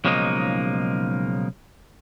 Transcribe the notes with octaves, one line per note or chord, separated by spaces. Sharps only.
B1 C#3 F3 G#3 A#3 D#4